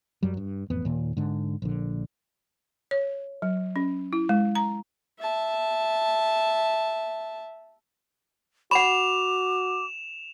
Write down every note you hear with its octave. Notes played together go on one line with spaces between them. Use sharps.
F#2 F#3 G3
G2
A1 F2 B3
D#2 A#2
G#2 D3
A#1 D3
C#5
F#3
C#4
E4
G#3
A#5
E5 A5
F#4 F#5 B5 D6 E7 F7